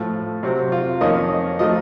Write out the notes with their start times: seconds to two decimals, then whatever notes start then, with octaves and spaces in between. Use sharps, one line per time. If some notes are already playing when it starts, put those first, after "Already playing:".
Already playing: A2 F3 A3
0.43 C3 F#3 C4
0.72 F4
1.01 F2 D#3 A#3 C#4 D#5
1.59 F3 A3 D#4 D#5